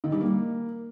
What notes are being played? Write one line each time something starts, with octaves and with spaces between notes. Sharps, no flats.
D#3
G3
A#3